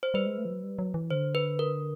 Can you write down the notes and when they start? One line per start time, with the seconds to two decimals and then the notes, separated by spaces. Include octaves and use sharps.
0.03 C5
0.14 G3 B4
0.26 G#3
0.38 A3
0.45 F3
0.50 F#3
0.63 G3
0.79 F#3
0.94 E3
1.10 D3 C5
1.35 B4
1.59 A#4